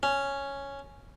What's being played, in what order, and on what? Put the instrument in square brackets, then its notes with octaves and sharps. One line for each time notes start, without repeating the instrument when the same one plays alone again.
[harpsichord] C#4